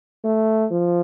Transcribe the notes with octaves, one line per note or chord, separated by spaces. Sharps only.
A3
F3